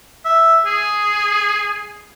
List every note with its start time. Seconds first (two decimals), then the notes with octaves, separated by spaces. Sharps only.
0.25 E5
0.65 G#4